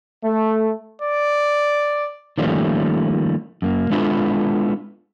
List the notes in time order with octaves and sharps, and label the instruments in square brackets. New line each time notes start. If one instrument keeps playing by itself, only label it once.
[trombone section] A3
[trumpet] D5
[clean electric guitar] D#3 F3 G3 A3 A#3 C#4
F#2 A#3
G#3 B3 D4 E4 F4 A4